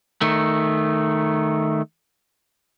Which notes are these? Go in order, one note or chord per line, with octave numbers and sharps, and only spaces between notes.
D#3 A3